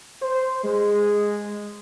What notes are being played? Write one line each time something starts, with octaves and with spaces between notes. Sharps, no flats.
C5
G#3